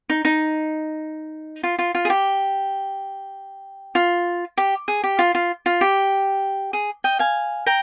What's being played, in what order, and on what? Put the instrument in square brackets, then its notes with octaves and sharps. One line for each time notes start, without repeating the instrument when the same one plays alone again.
[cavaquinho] D#4
D#4
F4
F4
F4
G#4
G4
F4
G4
G#4
G4
F4
F4
F4
G4
G#4
D#5 G5
F5 G#5
G5 A#5